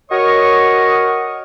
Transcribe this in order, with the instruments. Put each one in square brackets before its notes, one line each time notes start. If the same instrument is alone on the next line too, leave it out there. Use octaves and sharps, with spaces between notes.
[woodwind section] F#4 A#4 C#5 D#5 C#6 D#6